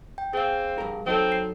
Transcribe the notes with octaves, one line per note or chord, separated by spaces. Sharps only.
G5
C4 G#4 F5
G2 A#4
F#3 C4 D#4 A4
C7